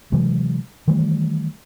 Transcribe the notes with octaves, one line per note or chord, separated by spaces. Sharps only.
C3 E3 F#3 G#3
D#3 E3 G3 A3